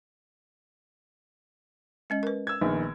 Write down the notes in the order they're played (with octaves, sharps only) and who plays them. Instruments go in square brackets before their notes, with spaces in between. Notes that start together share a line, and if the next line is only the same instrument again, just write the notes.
[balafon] G#3 C#4 D#5
A#4 B4
[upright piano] E6 G#6
A#1 D#3 B3